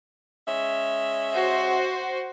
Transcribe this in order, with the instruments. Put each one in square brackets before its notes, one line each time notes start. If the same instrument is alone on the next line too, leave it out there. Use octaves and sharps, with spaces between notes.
[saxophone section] G#3 C#4 E5
[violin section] F#4 C5